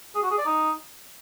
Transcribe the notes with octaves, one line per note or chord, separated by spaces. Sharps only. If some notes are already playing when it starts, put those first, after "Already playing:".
G#4
F#4
G#4
D5
D#4